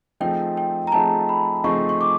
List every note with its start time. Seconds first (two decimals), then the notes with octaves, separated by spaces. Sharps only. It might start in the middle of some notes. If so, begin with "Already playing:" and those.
0.20 F3 A3 C4 D#4 G#4 G5
0.57 G5
0.87 A#5
0.92 F3 A3 C4 D#4 G#4 A5
1.29 B5
1.64 F3 A3 C4 D#4 G#4 C#6
1.89 C#6
2.01 D6